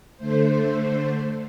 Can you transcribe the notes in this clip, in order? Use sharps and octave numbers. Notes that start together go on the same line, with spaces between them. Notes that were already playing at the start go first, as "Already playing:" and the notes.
D3 A3 C5